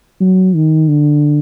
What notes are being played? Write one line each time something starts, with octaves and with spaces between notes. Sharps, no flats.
F#3
D#3
D3